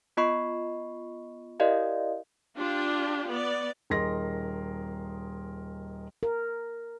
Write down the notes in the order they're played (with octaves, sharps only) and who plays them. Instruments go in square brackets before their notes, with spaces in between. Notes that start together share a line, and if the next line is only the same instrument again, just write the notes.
[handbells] B3 F4 D#5 B5 C#6 C7
E4 G4 A#4 D5 D#5 F5
[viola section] D4 F4 G4
B3 D5
[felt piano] D#1 G#4 A#4 D#5 C6 A#6
[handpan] A#4